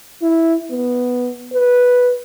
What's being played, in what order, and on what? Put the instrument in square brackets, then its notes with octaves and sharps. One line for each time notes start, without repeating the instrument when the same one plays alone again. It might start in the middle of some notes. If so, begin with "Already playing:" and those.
[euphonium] E4
B3
B4